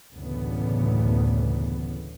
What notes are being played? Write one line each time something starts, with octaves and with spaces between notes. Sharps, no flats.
F#1 D2 A2 C#3 E3 B3